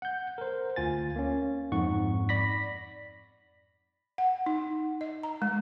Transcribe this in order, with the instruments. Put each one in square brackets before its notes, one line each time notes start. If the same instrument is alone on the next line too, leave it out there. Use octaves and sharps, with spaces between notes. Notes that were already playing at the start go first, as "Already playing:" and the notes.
[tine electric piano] F#5 G6
A#4 C5
D2 F4 G#5 A6
A#3 C#4
F2 G#2 D#4 F#5 C#6
D5 B5 A#6 B6
[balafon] F#5
D#4
D#5
A#5
G#3